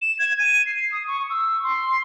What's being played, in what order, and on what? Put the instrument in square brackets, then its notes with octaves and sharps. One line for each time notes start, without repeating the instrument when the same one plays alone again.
[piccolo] E7
G#6
D#7
C7
D#6
C#6
E6
C6